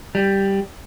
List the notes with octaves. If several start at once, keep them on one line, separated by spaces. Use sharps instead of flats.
G3